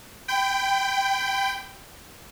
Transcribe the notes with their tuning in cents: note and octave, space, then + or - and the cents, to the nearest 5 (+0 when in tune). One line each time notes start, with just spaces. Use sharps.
G5 +0 B5 +35